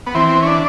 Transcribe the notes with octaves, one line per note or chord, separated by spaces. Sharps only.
B3
E3 C4
C#4
D4